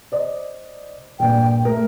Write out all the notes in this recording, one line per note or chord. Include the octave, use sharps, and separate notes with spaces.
C5 D5 D#5
A#1 G2 A#2 G5
A3 A#4